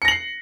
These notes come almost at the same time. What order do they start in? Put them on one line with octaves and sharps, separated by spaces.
C#7 A#6 F#7 C7